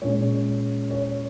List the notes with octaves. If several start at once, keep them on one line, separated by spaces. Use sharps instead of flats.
A#2 G#3 C#4 C#5
C#5